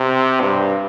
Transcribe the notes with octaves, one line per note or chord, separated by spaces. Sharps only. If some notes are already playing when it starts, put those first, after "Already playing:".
Already playing: C3
G2